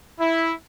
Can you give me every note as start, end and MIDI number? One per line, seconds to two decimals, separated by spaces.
0.20 0.52 64